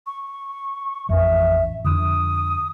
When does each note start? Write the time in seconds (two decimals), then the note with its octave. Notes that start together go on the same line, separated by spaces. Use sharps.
0.06 C#6
1.09 A1 F2 E5
1.84 F2 D3 D#6